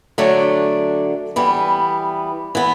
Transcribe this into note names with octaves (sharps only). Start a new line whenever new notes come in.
D3 F#3 A3 D4
E3 G3 B3
E3 B3